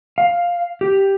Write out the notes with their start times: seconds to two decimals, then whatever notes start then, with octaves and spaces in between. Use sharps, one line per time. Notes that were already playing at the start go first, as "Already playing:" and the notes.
0.18 F5
0.81 G4